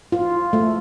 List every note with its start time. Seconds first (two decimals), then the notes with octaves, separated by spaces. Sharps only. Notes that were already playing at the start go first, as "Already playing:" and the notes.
0.12 F4
0.53 A3